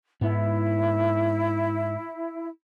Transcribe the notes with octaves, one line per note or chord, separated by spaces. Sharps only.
G#2 B3 E4